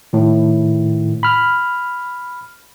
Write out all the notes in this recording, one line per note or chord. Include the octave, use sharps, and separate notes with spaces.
A2 D#3
B5 F6